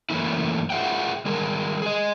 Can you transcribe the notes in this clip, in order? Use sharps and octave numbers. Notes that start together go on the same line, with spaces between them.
F#2 C#3 E3 A3 A#3 E4
F4 G#4 E5 F#5 G5
D#3 G3 G#4 A#4
G#4 D#5